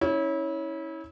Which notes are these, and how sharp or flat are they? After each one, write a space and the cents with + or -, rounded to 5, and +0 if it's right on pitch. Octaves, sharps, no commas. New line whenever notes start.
C#4 +0 E4 -30